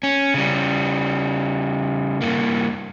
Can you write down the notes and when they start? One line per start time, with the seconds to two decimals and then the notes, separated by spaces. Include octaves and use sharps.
0.03 C#4
0.34 C#3 G3
2.21 G2 A#3